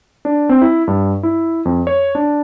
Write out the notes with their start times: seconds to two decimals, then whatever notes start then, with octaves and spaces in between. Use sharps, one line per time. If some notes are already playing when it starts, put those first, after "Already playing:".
0.25 D4
0.49 C4
0.62 E4
0.88 G2
1.23 E4
1.65 F2
1.87 C#5
2.15 D4